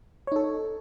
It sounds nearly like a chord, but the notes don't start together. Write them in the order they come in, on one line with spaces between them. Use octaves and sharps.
C#5 D#4 A4